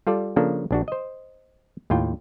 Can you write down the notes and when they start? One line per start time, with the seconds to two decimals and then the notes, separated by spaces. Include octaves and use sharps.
0.07 G3 F4 A4 D5
0.36 C#3 F3 A#3 D4 A4
0.71 A#1 D4 F#4
0.88 C5 D#5
1.90 D#2 A2 F4 G5